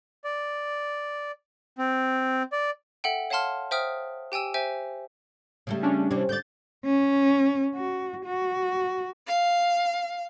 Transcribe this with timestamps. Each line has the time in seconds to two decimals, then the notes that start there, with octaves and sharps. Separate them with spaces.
0.24 D5
1.78 C4
2.52 D5
3.04 A4 E5 F#5 G5
3.30 C#5 F5 F#5 A5 C6 F6
3.71 C5 E5 G5 D#6 F6
4.32 G4 G5 G#5 E6 E7
4.54 C5 E5 G5 G#5
5.67 C#3 G3 A3
5.83 C#4 D4
6.11 C3 E3 G3
6.29 D3 D5 G6 A6
6.85 C#4
7.75 F#4
8.25 F#4
9.27 F5